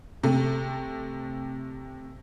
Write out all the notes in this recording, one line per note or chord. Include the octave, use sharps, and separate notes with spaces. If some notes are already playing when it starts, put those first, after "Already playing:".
C3 A3